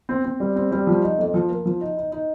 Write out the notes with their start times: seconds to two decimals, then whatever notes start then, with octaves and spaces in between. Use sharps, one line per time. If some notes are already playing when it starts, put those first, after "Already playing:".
0.09 C4
0.24 C4
0.40 G3
0.56 C4
0.72 G3
0.87 F3
1.03 D#4
1.19 F2
1.34 F3
1.50 A#3
1.66 F3
1.81 D#4
1.97 D#4
2.12 D#4